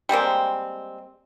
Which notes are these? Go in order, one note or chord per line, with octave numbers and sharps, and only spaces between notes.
G3 G#3 A#3 C4